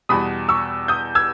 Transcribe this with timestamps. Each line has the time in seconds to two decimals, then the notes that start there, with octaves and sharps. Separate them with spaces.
0.09 E2 B2 G3 B5 D#6
0.49 C#6 E6
0.88 D#6 G6
1.15 E6 G#6